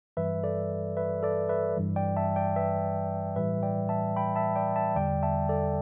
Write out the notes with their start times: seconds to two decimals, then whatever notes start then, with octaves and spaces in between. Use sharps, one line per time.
0.17 G2 E3 G3 B4 E5
0.43 A4 D5
0.97 B4 E5
1.23 A4 D5
1.49 B4 E5
1.77 G2 E3 G3
1.96 D5 G5
2.17 E5 A5
2.36 D5 G5
2.56 B4 E5
3.36 A2 E3 G3 B4 E5
3.63 D5 G5
3.89 E5 A5
4.16 G5 B5
4.36 E5 A5
4.56 D5 G5
4.76 E5 A5
4.96 E2 D3 G3 D5 G5
5.23 E5 A5
5.49 A4 D5